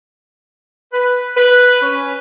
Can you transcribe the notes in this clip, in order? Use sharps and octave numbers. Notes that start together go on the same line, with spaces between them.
B4
B4
C#4